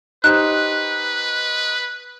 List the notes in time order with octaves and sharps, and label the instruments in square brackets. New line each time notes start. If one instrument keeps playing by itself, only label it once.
[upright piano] D#4 G4 C5 [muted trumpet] B4 [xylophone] F#6